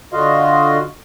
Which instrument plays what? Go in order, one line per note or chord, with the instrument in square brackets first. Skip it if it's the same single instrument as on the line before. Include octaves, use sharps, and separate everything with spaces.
[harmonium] D3 F4 F#4 D#5 F5